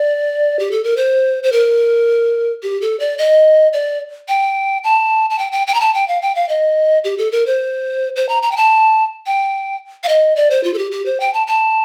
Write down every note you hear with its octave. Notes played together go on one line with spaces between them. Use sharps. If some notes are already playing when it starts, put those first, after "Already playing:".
Already playing: D5
G4
A4
A#4
C5
C5
A#4
G4
A4
D5
D#5
D5
G5
A5
A5
G5
G5
G5
A#5
A5
G5
F5
G5
F5
D#5
G4
A4
A#4
C5
C5
A#5
A#5
G5
A5
G5
F5
D#5
D5
C5
F4
A4
G4
G4
C5
G5
A5
A5